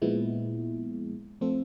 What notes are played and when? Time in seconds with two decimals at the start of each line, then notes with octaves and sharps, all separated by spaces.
0.02 A#2 F3 G#3 B3 E4
1.41 F3 A3 C4 F4 A4